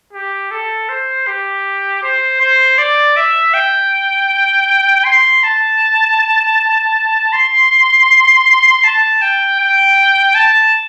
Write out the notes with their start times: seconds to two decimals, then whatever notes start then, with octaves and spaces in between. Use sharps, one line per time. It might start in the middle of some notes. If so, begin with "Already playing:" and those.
0.13 G4
0.51 A4
0.89 C5
1.27 G4
2.03 C5
2.40 C5
2.78 D5
3.16 E5
3.54 G5
5.05 C6
5.43 A5
7.33 C6
8.84 A5
9.22 G5
9.60 G5
10.35 A5